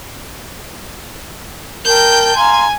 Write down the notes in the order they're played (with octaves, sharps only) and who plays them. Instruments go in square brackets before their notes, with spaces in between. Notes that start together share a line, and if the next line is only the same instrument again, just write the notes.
[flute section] A#4 A5 [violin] G5 G6
[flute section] F5 A#5 C6 [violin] G#5